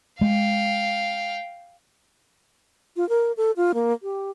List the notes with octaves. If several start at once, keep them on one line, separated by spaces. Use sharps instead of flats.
G#3 F5 G5
F4
A#4
A4
F4
A#3
G4